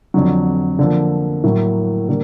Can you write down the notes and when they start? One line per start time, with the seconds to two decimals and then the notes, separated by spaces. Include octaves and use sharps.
0.14 F2 D3 F#3
0.79 D3 F3 A#3
1.44 A2 F#3 A#3
2.08 D3 G3 A#3